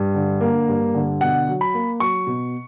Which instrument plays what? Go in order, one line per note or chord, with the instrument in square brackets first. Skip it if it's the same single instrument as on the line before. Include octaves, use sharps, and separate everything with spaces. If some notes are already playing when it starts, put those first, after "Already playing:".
Already playing: [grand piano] G2
D3
A#3
G2
D3
B2 F#5
F#3
B5
A#3
F#3 C#6
B2